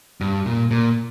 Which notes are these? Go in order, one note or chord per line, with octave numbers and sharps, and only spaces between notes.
G2
A#2
A#2